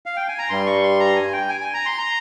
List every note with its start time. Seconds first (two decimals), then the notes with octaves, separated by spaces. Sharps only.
0.06 F5
0.17 G5
0.28 G#5
0.39 A#5
0.49 G2 G3 C6
0.66 C#6
0.83 C6
1.00 A#5
1.16 G#5
1.33 G5
1.49 G#5
1.61 G#5
1.74 A#5
1.86 C6
1.98 A#5